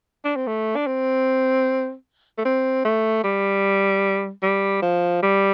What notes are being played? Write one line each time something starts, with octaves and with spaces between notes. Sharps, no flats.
D4
C4
A3
D4
C4
A3
C4
A3
G3
G3
F3
G3